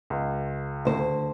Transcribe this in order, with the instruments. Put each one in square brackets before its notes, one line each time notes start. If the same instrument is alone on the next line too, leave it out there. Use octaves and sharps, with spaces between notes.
[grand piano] C#2
[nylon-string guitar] D2 C5